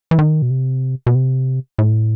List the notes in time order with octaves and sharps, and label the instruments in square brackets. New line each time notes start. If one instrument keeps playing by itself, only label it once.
[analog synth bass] E3
D#3
B2
C3
B2
C3
A2